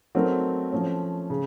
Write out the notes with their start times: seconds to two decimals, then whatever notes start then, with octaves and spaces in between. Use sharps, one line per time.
0.15 F#3 A3 C4 D#4 A#4
0.72 F3 A3 C#4
1.30 C#3